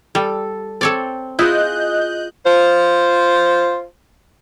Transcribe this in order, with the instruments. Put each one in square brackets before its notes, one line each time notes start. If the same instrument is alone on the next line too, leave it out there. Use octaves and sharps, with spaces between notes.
[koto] G3 [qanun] A4
[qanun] C4 [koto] A4 C#5 D5
[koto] E4 [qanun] F4 G#4 [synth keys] D#5 F#6 G6
[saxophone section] F4 C5